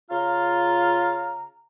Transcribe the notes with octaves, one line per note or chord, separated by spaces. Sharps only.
C#3 F4 F5 A#5